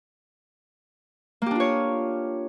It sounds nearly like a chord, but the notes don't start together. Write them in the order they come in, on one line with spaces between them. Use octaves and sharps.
A#3 G4 D4 F4 C#5